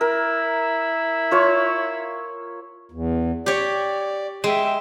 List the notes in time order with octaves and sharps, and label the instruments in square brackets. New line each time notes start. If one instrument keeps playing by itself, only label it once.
[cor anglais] E4 [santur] A#4
[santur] F4 C#5 C#6
[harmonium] E2
[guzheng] G4 C#5 [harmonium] D5
[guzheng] G#3 [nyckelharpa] E5 G5